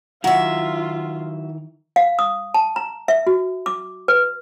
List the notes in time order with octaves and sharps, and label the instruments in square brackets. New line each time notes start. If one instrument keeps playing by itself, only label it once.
[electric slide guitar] D#3 E4 A#5 [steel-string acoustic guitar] F#3 E5 [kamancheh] F4 [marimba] F#5
[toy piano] F5
D#6
A5
A#5
E5
F#4
D6
B4